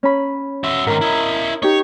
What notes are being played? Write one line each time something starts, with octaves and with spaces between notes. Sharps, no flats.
C#4 B5
F#4 E5
G#2 D#3 A#4
E4 D#5
D#4 G4 C#5